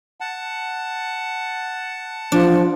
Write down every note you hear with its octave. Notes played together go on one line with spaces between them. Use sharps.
F#5 A5
F3 D4